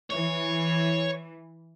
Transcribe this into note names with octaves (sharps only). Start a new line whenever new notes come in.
E3 C#5